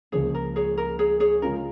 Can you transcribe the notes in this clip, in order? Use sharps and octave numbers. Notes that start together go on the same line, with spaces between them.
C#2 C#3 F3 A#3 G#4 C#5
A#4
G#4 C#5
A#4
G#4 C#5
G#4 C#5
C#3 G#3 C#4 F4 G#4 A#4